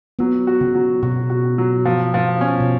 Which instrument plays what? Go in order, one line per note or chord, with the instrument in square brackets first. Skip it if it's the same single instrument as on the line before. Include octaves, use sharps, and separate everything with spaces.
[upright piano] F#3 [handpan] B3
[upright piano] F#4
[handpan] C#3
[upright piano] F#3
[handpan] B2 [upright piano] F#4
[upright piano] F#4
F#3
F3
F3
C#4
[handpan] B2